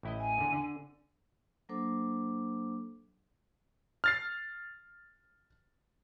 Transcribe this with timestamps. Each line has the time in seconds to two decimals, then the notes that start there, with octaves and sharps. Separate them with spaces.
0.03 A1 E4 D#5
0.20 G#5
0.38 E2 D3
0.53 D3
1.69 F#3 A#3 D4 A4 C5 D6
4.04 F6 A6 C7